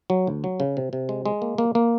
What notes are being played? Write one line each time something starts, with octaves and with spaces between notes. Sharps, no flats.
F#3
D2
F#3
C#3
C3
C3
G#3
G#3
A#3
A#3
A#3